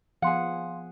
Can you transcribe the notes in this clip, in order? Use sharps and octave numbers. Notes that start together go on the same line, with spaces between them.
F3 B3 G#4 F5 F#5 C6